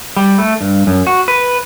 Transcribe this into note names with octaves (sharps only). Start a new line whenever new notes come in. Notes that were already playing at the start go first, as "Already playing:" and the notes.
G3
A3
G2
F#2
F#4
B4